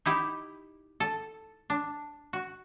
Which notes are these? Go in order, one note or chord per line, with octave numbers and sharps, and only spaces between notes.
D#4 E4 G4
A4
D4
F#4